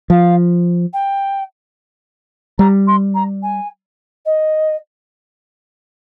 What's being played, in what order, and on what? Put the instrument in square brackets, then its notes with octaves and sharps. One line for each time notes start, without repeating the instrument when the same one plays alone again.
[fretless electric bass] F3 [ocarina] F5
[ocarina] G5
[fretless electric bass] G3 [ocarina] A#5
[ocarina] C6
A#5
G#5
D#5